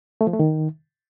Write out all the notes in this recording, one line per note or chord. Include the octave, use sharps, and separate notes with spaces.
A3
F3
A3
D#3